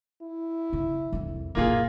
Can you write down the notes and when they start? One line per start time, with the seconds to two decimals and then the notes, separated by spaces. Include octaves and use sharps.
0.22 E4
0.73 C#3 C#4
1.13 C2 F2
1.55 F#1 A#2 A#3 F4 G#4